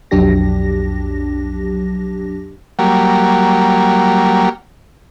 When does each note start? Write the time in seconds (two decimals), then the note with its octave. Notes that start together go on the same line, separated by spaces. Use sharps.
0.11 B1 F2 F#3 D4 G4 A#6
2.79 F#3 G3 A#3